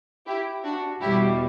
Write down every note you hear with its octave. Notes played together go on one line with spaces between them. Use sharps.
E4 G4
D4 F#4
E2 B2 G3 E4 G4